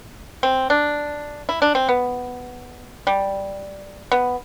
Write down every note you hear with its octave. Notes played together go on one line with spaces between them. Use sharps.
C4
D4
E4
D4
C4
B3
G3
B3